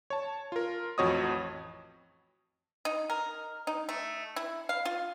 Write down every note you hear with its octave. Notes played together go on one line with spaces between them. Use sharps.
C#5 A5
F4 A#4
A1 F2 F#4 C#5 D#5 D#6
D#4
A#4
D#4
A3
E4
F5
F4